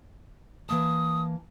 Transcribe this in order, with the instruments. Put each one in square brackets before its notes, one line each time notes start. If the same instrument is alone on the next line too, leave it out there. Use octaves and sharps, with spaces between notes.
[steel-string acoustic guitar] E3 A#3 A5 [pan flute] D#6